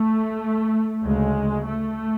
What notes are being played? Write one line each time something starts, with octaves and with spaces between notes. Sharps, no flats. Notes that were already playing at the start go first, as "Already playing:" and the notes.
Already playing: A3
D2 C#3 G#3
A3